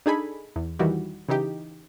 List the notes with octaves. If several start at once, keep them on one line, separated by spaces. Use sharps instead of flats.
D4 D#4 G#4 A4 G#5 B5
E2
D#3 E3 G3 F#4 G4
C#3 E3 D#4 G4